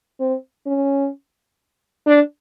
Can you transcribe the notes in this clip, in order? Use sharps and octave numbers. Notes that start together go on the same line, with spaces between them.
C4
C#4
D4